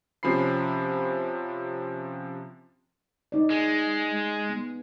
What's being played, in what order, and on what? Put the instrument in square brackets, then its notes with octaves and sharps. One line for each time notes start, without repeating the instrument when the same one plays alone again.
[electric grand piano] C3 F3 C#4 B5 C7
[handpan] D#4 D5
[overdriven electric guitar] G#3
[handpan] B3